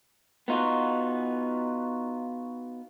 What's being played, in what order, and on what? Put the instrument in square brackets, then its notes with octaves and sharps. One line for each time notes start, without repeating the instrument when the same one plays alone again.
[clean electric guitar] B3 D#4 F4 F#4